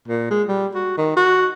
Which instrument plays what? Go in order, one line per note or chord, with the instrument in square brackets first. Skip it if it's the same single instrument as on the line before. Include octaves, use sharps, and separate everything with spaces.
[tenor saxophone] A#2
G#3
G3
F#4
D#3
F#4